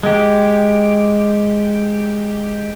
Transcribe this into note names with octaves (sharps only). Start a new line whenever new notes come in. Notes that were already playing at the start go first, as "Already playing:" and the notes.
G#3 G4